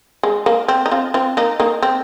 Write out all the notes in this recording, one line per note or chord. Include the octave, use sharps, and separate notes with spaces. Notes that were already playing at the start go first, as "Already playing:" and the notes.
G#3
A#3
C4
D#4
C4 F4
C4 F4
A#3 D#4
A#3 D#4
C4